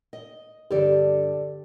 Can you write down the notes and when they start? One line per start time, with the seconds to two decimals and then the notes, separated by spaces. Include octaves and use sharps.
0.13 D#5
0.71 G2 D3 G4 A4 D5